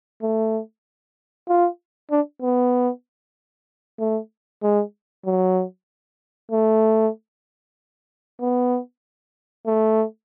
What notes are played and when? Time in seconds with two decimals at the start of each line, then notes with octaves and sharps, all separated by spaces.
0.22 A3
1.48 F4
2.11 D4
2.42 B3
4.00 A3
4.63 G#3
5.26 F#3
6.52 A3
8.41 B3
9.66 A3